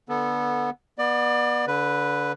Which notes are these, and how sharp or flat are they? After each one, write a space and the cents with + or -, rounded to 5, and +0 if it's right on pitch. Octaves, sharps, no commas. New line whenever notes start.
D3 +0 B3 -15 A4 -5
B3 -25 D5 +25
D3 -25 B4 +0